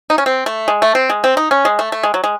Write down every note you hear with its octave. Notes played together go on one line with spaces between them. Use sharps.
D#4
C#4
C4
A3
G#3
A3
C4
G#3
C4
D#4
C#4
G#3
A3
A3
G#3
F#3
G#3